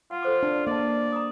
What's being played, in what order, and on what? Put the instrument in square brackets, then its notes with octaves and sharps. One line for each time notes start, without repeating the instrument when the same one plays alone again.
[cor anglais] F4 [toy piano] F#5
[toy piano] A4 C5 D6
[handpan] D4
[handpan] A#3 [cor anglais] D5 [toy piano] D#5 A5
[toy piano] A#5 D#6